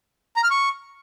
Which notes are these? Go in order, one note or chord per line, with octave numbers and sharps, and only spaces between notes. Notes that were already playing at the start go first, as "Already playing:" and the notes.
A#5
F6
C#6